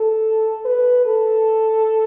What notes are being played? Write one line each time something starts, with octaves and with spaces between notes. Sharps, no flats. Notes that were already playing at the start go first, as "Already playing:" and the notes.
Already playing: A4
B4
A4